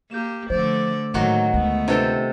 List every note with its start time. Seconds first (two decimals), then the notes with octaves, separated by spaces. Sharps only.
0.11 A#3 G4 G6 E7
0.50 D3 F3 A3 C5 D5
1.14 A2 D#3 F#3 A3 A#3 F#4
1.53 D2 G#3 A3 B3
1.88 C3 D4 F4 A4 B4 G5